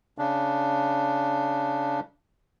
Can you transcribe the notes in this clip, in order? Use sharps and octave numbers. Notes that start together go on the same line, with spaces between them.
C#3 D4